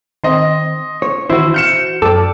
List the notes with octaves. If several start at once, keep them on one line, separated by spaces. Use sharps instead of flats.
D#3 C4 D#5 C6
C5 C#5
D#3 E3 E4 F#4 C5
F6 G6 C#7 E7
F#2 A4 D5 G5 D6